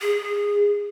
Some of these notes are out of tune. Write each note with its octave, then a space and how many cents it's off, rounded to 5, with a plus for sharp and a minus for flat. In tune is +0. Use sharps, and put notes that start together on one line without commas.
G#4 -20